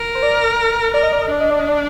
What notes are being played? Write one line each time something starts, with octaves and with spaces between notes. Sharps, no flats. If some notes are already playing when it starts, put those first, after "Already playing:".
Already playing: A#4
C5
D5
A#4 D5
D#5
D5
D#5
D4 D5
D#5
D5
D#5
D5